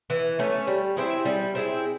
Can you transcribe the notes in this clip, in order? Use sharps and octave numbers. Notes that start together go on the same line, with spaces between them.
E3
A3 C#4
G3
C4 E4 G#4
G3
C4 E4 G#4